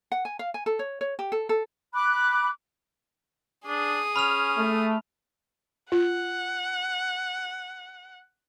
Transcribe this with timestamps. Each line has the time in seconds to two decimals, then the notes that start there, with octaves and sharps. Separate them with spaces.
0.12 F#5
0.25 G#5
0.39 F5
0.54 G#5
0.66 A4
0.79 C#5
1.01 C#5
1.19 G4
1.32 A4
1.49 A4
1.93 B5 D6 F#6
3.67 D4 G#4 D#6
4.16 C#4 B5 F6 F7
4.57 A3
5.92 F4 F#5